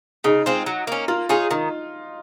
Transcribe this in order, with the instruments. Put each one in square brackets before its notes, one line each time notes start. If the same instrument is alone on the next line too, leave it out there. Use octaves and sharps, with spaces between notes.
[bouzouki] C#3 [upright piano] D#4
[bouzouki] G#3 C4 F4
F#3
A#3 C#4
[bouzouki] A#3 [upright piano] F4
[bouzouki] D#4 G#4 C#5 [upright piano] F4
[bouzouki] D#3 [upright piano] D#4